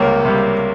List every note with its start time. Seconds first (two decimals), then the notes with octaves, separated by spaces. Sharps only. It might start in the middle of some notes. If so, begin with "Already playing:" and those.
Already playing: C#2 C3 G3 A#3 C#4
0.25 C3 G3